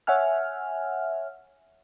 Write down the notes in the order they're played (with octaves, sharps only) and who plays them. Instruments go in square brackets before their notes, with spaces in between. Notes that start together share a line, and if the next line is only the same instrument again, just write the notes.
[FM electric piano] C#5 E5 F#5 G#5 F6